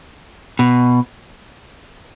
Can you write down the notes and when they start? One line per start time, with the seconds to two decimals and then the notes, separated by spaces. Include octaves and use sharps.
0.59 B2